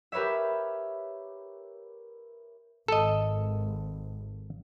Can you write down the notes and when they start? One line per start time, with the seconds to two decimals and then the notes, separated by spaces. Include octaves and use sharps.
0.12 G4 A#4 B4 C#5 E5
2.88 G#1 A4 D#5